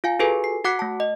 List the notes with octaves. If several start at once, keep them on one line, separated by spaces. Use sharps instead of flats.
F4 F5 G#5
F4 F#4 G#4 A4 B4 G#5
C7
F#4 F#5 D6 F#6 B6 C#7
A3 A5
D#5